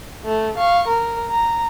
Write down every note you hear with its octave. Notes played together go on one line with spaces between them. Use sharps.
A3
F5 C#6
A#4
A#5